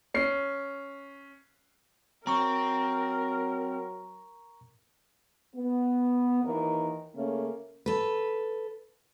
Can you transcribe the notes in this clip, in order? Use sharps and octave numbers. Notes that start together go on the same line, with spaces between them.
C#4 C7
F#3 C4 A#4 A#5 C#6
B3
D#2 D#3 E3 A#4
C#3 A3 A#3 C#4
A4 B4